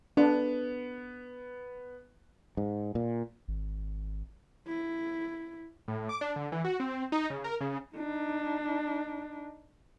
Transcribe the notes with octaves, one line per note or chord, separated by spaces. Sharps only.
B3 D4
G#2
A#2
G#1
E4
A2
D6
D4
D3
E3
F#4
C4
D#4
C#3
A#4
C#3
D4 D#4